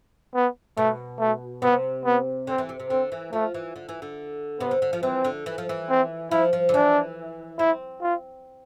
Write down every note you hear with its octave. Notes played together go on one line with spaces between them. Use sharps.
B3
B2 A3
A3
C3 B3
B3
D3 C4
E3
C3
C3
D3 C4
E3
F3 A3
E3
D3
E3
D3
C3 B3
D3
D3
F3
E3 C4
D3
E3
F3
E3
C4
F3 E4
F3
D3
E3 D4
C4 E4
F4